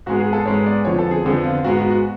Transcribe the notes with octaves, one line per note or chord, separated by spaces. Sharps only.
G#2 G#3 B3 F#4
G#4
A4
G#2 G#3 B3 C#5
D5
F2 D3 F3 B3 C#5
A4
G#4
F2 D3 F3 B3
F4
G#2 G#3 B3 F#4
F#4
F#4